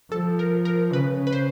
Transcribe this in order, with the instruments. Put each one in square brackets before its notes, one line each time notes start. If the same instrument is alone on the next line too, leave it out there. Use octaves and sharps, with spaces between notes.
[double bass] F3 [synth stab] A4
[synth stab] A#4
A#4
[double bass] C#3 [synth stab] B4
[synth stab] B4
C5